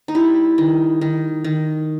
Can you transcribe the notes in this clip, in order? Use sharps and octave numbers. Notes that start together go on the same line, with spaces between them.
D#4
G3 E4
D#3
D#3
D#3